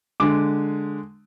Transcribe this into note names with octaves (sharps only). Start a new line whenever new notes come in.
D3 G#3 D6